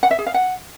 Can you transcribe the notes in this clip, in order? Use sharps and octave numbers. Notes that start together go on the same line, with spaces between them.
F#5
E5
G#4
F5
F#5